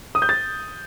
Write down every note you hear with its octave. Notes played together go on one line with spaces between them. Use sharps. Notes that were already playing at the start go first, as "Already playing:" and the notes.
D#6
G6
A6